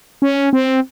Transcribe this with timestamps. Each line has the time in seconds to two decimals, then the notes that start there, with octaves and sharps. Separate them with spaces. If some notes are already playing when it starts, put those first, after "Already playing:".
0.22 C#4
0.53 C4